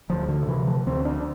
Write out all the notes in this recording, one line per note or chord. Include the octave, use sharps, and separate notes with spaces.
D2 F3
D3
C3 E3
F3
D2 C4
D4